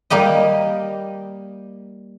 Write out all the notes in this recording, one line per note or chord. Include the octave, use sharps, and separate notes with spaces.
G3 A#3 G4 D#5